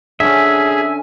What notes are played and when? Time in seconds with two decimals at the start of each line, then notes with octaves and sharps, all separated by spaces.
0.20 D3 C#4 G#4 E5 G#5